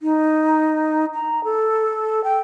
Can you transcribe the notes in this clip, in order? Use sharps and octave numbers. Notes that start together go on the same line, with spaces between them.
D#4
A#5
A4
G5